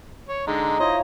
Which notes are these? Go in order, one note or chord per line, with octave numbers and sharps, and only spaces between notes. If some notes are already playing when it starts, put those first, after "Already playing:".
C#5
D3 G#3 D#4
E4 F4 C5 C#5 D#5